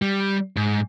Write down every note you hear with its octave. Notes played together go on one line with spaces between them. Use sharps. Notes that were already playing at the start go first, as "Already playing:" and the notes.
G3
G#2